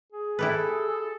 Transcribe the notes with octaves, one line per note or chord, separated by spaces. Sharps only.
G#4
E4 G4 A4 B4